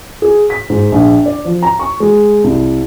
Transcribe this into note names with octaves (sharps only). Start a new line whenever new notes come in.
G#4
B6
G#2
A#1
D5
F3
A#5
C#6
G#3
C2